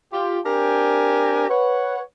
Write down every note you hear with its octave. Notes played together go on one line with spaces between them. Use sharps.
F4 G4
C4 D4 G4 A#4 G5 G#5
B4 C#5 F#5